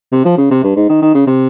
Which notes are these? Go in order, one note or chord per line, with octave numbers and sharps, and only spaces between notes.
C3
F3
C#3
C3
G2
G#2
D#3
D#3
C#3
C3